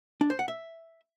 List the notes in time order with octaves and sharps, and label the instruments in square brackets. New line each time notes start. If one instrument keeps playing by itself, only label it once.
[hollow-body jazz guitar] D4
C5
F#5
E5